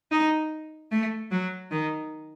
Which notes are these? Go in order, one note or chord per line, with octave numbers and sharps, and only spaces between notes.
D#4
A3
F#3
D#3